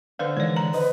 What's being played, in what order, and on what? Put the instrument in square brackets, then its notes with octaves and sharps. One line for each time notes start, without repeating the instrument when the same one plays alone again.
[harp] D3 [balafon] B4 C5 [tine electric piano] F5
[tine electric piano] D#3 E3 G#3 [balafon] C#5 D5
[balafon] A#5
[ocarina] B4 [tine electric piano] C5 [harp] D#5